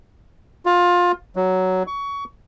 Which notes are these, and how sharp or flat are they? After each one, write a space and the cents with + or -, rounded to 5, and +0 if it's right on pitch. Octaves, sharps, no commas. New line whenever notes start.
F4 +20
F#3 +10
C#6 +25